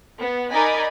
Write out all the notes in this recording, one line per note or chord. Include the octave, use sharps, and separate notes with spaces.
B3
D#4 A#4 D5 D#5 G#5 B5